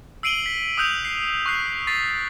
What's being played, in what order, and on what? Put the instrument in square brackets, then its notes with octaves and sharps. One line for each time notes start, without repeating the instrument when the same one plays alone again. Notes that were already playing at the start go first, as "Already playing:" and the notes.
[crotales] E6 C7 D7 D#7 F#7 G7
B6
D#6 E6 F#6 G6 F7
C7
C#6 F#6 C7
C#6 A6 B6 C7